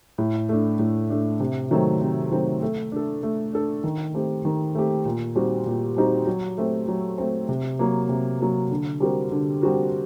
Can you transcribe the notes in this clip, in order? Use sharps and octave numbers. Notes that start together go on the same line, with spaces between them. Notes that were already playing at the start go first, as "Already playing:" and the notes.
A2
A3 D4
A2
A3 D4
C3
D#3 F#3 A3 C4
C3
D#3 F#3 A3 C4
A3
D4 A4
A3
D4 A4
D#3
A3 C4 G4
D#3
A3 C4 G4
A#2
G3 C4 D#4 F#4
A#2
G3 C4 D#4 F#4
F#3
A3 C4
F#3
A3 C4
C3
F#3 A#3
C3
F#3 A#3
D3
G3 C4 F#4 A#4
D3
G3 C4 F#4 A#4